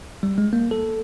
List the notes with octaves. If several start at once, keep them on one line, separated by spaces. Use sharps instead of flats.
G3
G#3
A#3
A4